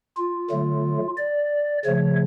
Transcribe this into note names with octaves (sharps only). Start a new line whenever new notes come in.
F4
D3 F#3 A3
D5
C#3 F3 A3 C#5